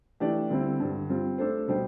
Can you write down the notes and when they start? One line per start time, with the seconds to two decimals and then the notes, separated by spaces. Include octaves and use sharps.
0.20 E3 A3 D4 G4 D5
0.50 D3 G3 C4 E4
0.80 G2 D3 G3
1.09 G3 C4 F4
1.38 A3 D4 A4 C5
1.68 B2 G3 D4 G4 C5